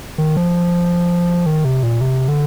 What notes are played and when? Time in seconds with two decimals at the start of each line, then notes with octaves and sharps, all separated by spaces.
0.18 D#3
0.37 F3
1.46 D#3
1.65 C3
1.83 A#2
2.01 C3
2.28 D3